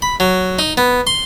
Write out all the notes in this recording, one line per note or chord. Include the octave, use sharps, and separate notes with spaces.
B5
F#3
D#4
B3
C6